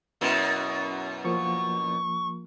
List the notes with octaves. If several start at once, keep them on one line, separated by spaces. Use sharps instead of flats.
F#2 B2 E4
F3 A#3 C#6